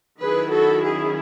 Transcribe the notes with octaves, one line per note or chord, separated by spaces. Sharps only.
D#3 F#3 C#4 E4 G#4 B4
F#4 A4
G#4